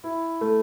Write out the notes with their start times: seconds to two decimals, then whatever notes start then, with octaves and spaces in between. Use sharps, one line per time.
0.04 E4
0.41 A3